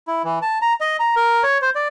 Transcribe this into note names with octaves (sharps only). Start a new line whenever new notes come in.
E4
E3
A5
A#5
D#5
A#5
A#4
C#5
C5
D5